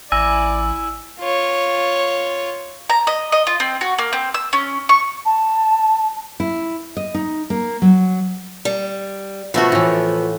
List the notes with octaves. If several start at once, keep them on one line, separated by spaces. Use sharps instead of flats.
A1 E4 D5 G#5 E6
F4 C#5
A#5
D#5
D#5
F4
C4
F#4
A#3
C4
E6
C#4
C#6
A5
E4
D#5
D#4
A#3
F#3
G3
B2 F3 A3 B3 F#4
A2 E3